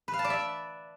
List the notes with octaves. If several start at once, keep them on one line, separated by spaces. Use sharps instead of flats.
B4
F5
A5
D5
E5